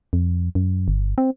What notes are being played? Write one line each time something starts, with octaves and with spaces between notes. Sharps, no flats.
F2
F#2
G1
C4